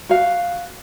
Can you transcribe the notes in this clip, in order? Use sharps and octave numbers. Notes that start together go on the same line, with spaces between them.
F#4 F5